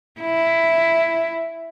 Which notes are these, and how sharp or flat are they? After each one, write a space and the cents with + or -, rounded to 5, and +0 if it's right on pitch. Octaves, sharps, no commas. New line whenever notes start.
E4 +5